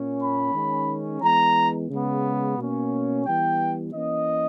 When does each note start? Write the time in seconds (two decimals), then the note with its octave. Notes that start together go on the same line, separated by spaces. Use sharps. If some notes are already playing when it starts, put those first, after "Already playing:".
Already playing: A#2 A#3 C#4
0.20 B5
0.53 D#3 G#3 C#4
1.22 E3 G#3 B3 A#5
1.90 C#3 G#3 B3
2.58 B2 A#3 C#4
3.26 E3 G3 B3 G5
3.94 E3 A#3 C#4 D#5